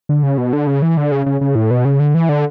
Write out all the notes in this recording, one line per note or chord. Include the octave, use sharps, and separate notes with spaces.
D3
C#3
B2
D3
C#3
E3
D3
C#3
C#3
C#3
A2
B2
C#3
D3
E3
D3